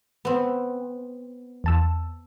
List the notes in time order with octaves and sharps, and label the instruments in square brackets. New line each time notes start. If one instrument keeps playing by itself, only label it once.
[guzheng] B3 C4
[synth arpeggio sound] E2 A5 E6